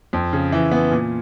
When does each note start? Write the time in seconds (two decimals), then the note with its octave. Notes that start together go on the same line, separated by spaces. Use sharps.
0.13 F2
0.33 C#3
0.52 E3
0.71 B3
0.91 A#2